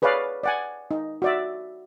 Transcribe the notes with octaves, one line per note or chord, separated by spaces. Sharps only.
G#4 B4 C#5 D5 F5
D5 F#5 G#5
D#4
F#4 D5 E5